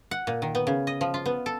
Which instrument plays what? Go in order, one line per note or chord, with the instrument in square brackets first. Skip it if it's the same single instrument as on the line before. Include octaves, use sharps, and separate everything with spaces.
[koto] F#5
A#2
D#3
B3
C#3
D#5
F3
F4
B3
A4